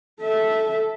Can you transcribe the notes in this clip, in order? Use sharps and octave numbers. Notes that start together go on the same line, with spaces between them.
A4 E5